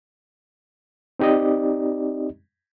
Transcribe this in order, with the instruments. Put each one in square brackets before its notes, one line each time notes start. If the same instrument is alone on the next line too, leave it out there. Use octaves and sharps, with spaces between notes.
[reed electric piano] C4 D#4 G4 D5 D#5